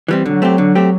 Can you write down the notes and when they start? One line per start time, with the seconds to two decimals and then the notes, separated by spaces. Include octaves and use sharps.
0.08 E3 G3 C4
0.26 D3 F#3
0.42 A3 C4 G4
0.58 D3
0.75 A3 C4 G4